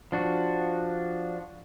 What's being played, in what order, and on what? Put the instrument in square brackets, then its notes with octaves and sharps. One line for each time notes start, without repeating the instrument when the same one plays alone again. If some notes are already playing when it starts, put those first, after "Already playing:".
[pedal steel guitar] F3 D4 F#4